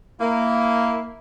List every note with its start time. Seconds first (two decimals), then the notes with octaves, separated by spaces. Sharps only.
0.20 A#3 E4